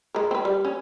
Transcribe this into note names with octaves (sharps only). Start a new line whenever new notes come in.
G#3 A#4
C4 B4
G3
C#4